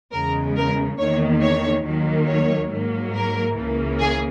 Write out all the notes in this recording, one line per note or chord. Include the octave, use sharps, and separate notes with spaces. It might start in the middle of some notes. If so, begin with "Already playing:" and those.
E2 C#3 G#3 A#4
A#4
E2 D#3 A#3 C#5
C#5
D#2 D#3 F#3 A#3
C#5
G#2 F#3 A#3
A#4
C#2 C#3 E3 A#3
G#4